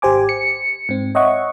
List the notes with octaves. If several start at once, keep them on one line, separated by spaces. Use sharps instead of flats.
G#1 G4 C5 G#5 D6
C#7
G#2 C4
C#5 D#5 E5 F#5 C#6